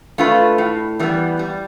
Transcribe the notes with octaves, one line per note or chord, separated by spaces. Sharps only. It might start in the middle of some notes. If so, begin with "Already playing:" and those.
A3 D4 F4 B4
A2
E3 G3 B3
G3